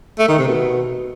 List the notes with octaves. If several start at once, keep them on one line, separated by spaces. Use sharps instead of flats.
A3
D#3
C3
B2